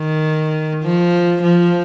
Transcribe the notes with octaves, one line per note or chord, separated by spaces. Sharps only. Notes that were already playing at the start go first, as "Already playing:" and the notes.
Already playing: D#3
F3
F3